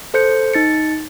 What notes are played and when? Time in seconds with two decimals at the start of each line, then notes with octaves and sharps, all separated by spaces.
0.14 A4 C5 G6 C#7
0.54 D#4 A6 C#7